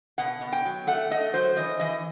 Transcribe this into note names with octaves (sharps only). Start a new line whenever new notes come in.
B2 F#5
B2
G5
F#3
A3 F#5
A3 D#5
F#3 C5
E3 D#5
E3 D#5